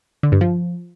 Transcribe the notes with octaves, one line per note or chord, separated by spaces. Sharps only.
D3
G2
F3